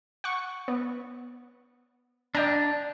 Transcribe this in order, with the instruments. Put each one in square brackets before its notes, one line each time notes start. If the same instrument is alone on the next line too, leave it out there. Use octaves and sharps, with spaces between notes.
[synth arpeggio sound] F#5 C#6
B3
[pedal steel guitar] D4 [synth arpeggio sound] D5 G5 A#5